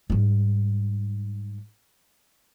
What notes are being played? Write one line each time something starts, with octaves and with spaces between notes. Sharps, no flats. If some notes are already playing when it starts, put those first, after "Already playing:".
G#2 G3